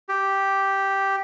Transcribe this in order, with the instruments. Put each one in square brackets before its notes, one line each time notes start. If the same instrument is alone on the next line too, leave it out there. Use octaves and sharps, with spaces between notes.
[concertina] G4